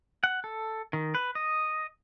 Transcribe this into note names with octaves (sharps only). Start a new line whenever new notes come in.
F#5
A4
D#3
B4
D#5